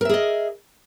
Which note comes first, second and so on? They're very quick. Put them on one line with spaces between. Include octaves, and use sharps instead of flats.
A#4 E5 G#4 D#5